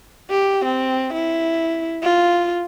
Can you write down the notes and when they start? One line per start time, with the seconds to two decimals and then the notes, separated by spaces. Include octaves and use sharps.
0.30 G4
0.65 C4
1.13 E4
2.03 F4